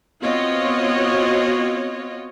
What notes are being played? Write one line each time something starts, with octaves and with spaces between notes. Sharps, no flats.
B3 C4 F4 F#4 C#5 D#5